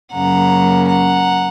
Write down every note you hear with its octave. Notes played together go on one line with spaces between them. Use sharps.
F#2 C#3 F#3 A#3 F#5 A#5
F#5 A#5